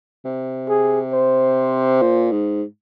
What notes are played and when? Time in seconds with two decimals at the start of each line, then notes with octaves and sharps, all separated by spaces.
0.25 C3
0.69 G#4
1.13 C5
2.02 A#2
2.31 G#2